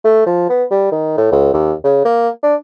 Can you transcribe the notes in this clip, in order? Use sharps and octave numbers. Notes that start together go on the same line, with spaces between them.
A3
F3
B3
G3
D#3
A2
C#2
D#2
C#3
A#3
D4